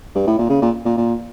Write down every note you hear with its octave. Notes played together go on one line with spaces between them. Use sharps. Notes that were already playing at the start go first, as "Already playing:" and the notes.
G2
A2
A#2
C#3
A#2
A#2
A#2